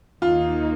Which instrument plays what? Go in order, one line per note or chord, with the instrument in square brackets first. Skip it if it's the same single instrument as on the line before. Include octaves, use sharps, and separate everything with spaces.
[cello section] D#2 D#3 A#3 D#4 [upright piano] F4